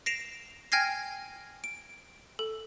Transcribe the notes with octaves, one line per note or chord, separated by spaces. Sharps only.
A#6 C7 D7 E7 F7
G5 G#5 F6 G#6 A#6 C7
D7
A4